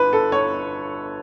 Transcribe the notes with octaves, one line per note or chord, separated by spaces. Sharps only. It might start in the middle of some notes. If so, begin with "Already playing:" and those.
Already playing: G1 B4
A4
C#5